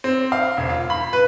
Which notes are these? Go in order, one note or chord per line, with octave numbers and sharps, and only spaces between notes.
C4
F5
E1
F4
B5
B4